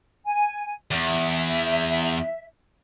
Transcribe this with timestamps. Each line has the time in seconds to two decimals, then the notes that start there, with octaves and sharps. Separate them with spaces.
0.25 G#5
0.91 E2 E5